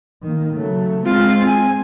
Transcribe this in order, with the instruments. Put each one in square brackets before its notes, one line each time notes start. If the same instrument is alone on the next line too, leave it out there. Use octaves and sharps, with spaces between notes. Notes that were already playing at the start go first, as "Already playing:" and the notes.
[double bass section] D#3 A#3
C#3 F#3 A3
[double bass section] G#3 C4 [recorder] F4
[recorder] G#5